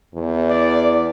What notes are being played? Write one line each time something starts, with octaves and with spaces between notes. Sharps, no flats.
E2
D5